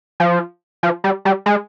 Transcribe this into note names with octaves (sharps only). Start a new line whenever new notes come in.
F3
F3
G3
G3
G#3